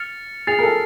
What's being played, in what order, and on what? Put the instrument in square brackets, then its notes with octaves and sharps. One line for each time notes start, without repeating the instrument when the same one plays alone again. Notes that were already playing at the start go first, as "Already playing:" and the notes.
Already playing: [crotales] F6 A6 C#7 F7
[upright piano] G#4 [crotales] A6 C7 F7
[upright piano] A#4
A4